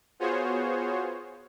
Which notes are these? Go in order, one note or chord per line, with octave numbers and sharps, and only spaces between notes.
B3 F4 F#4 G#4 C5 C#5